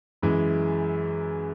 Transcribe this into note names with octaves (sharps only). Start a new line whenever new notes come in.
F#2 E3 G#3